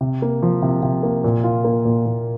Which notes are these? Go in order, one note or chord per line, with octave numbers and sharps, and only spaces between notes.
C3
A#3
F3
C3
C3
A#3
A#2
F4
A#3
A#2
A#2